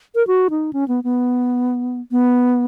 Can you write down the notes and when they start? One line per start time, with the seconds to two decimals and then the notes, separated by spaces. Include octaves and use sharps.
0.15 A#4
0.27 F#4
0.50 D#4
0.73 C#4
0.88 B3
1.04 B3
2.11 B3